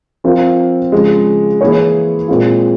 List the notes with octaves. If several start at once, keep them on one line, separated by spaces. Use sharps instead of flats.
F3 C4 F4 A#4 F5
C#3 F3 G#3
E3 A#3 E4 G#4 C#5
A#2 G#3 C4 F4